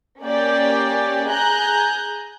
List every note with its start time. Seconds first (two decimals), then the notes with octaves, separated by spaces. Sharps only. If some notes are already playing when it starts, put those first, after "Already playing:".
0.23 A#3 C#4 G4 D5 G5
1.27 G#4 G#5 A#5 F#6 G6